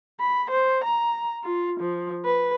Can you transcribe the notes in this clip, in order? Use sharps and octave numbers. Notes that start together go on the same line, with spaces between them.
B5
C5
A#5
F4
F3
B4